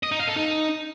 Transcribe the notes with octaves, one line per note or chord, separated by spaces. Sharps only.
D#5
D#4
F5
A4
D#4